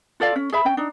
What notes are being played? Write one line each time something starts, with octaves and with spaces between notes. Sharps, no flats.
F4 A4 D5 F5
C#4
G#4 E5 B5
C#4 G5
D4 D#4